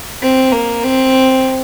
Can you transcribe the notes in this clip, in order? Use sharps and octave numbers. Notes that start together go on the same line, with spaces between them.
C4
A#3
C4